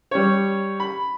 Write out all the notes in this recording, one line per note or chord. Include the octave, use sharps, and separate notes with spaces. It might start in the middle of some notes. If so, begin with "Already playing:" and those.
G3 C#5
B5